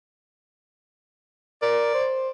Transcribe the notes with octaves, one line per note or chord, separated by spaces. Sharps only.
A#4 D5
C5